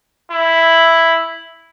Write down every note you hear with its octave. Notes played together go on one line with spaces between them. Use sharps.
E4